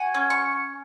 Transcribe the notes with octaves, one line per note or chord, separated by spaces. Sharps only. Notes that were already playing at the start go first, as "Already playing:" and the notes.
Already playing: F#4 G#5
C#4
C#6